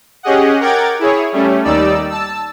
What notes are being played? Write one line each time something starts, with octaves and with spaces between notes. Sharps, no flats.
C#4 G4 G#4 D#5 F#5
A#4 F#5 G5 D6 G#6 A6
E4 G#4 C#5
G3 A3 C#4
D#2 G3 D#4 D5 E6
A5 E6